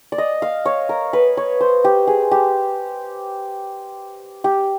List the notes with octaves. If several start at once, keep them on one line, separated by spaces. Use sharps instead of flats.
D5
D#5
F5
C#5
A#4
B4
C#5
C5
G4
G#4
G4
G4